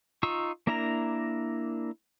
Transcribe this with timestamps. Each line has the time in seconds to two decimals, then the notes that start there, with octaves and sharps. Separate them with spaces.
0.23 D#4 F4 C#6 E6
0.67 A#3 D4 E4 A#4 A#5